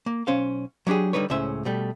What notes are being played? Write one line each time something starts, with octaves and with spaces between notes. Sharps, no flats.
A#3
B1 C#4 C5 F5
F#3 G3 D4 G4 G#4
D3 G3 A#3 D#4 B4 C#5
C#2 A2 C#4 C5 E5
B2 G3 A3